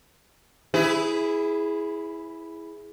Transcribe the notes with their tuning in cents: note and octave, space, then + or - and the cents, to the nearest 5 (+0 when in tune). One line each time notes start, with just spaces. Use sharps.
E4 -5 G#4 +0 B4 +30